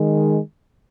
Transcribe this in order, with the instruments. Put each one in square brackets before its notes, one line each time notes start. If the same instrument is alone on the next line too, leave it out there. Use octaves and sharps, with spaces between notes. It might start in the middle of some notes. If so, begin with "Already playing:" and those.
Already playing: [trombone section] D#3 G#3